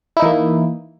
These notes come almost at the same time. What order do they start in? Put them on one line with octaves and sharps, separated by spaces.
E4 D#4 E3 A#3